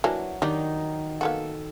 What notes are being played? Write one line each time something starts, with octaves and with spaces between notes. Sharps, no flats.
E3 F#3 A#3 D4
D#3 G3 D4 D#4 D5
A#3 B3 F#4 A4